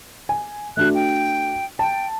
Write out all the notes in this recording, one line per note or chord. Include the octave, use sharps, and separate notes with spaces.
G#5
A3 D4 F#4 F#6
G5
G5 A5